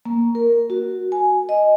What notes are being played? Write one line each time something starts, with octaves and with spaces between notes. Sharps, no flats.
A#3
A#4
F#4
G#5
D#5